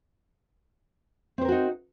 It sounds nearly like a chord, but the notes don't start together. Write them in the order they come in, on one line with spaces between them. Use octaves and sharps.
C4 C5 A#4 F#4 D#4